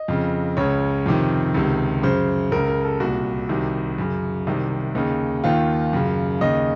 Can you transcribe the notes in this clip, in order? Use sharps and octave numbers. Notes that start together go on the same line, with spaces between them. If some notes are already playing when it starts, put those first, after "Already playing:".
Already playing: D#5
F2 C#3
C#2 C#3 C#5
F2 C3 D#3
C#2 C3 D#3
F#2 C#3 C5
C#2 C#3 A#4
A#4
A4
C2 A#2 F#4
C2 C3 D#3
F#2 C#3
C2 C3 D#3
D#2 C#3 D#4
D#2 D#3 F4
F#2 C#3
D#2 C#3 D#5